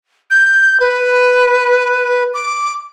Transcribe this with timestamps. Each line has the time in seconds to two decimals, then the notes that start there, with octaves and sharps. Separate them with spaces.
0.30 G6
0.80 B4
2.34 D6